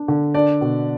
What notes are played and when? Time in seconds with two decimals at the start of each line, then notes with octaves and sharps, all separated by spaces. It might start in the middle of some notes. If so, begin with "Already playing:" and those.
Already playing: D4
0.08 D3
0.34 D4 D5
0.61 B2